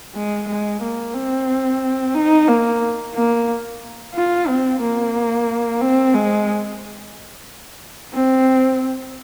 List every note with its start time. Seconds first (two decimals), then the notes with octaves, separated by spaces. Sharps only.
0.15 G#3
0.48 G#3
0.82 A#3
1.15 C4
2.14 D#4
2.48 A#3
3.14 A#3
4.15 F4
4.47 C4
4.81 A#3
5.81 C4
6.14 G#3
8.14 C4